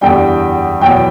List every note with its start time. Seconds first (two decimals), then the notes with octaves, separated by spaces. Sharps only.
0.01 F#1 E2 D3 G3 G5
0.81 E2 B2 F#3 G5